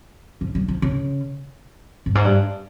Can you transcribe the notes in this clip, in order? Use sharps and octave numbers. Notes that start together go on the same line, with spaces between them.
F3
G3
F3
C#3
G2
G#2
G2